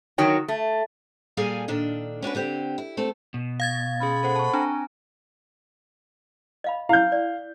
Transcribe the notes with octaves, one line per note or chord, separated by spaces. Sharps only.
D#3 F#3 F#4 C#5 G5
A3
A#2 G3 G#4 A4 F5 G#5
A#2 D#3 D4 A4
C#4 D4 F#4 B4
D3 C4 G4
E4
A3 C4 A4
B2
F5 G#6 A6
B3 C#4 G#4 B5
A4 C5 F#5
A5 C#6
C4 D4 G#5 A#5
D#5 F5 B5
E4 F5 G6
D5